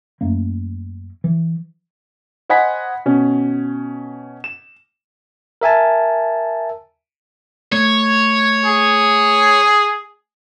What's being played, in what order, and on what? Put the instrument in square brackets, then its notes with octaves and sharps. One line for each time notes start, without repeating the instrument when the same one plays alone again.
[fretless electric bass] F#2 A3 A#3
E3
[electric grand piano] C5 D#5 F#5 G#5 B5 B6
B2 C#4
E7
[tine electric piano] A#4 E5 G#5 A5
[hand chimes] A3 [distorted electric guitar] C#5
[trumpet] G#4